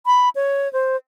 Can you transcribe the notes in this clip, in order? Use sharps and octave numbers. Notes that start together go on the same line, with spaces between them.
B5
C#5
C5